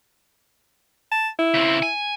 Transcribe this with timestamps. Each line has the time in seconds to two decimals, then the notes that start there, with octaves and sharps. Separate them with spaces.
1.11 A5
1.39 E4
1.54 C#3 C4
1.82 G#5